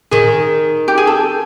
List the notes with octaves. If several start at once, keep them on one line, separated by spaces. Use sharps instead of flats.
D#3 G#4
G4
G#4
A4